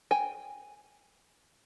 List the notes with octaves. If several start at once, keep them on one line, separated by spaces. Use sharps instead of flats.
G5 G#5